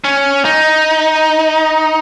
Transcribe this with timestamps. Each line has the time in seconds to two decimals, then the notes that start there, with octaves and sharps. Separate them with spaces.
0.04 C#4
0.45 D#4